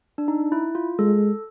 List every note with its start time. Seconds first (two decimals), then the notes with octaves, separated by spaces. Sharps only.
0.18 D4
0.28 D#4
0.52 E4
0.75 F4
0.99 G#3 A4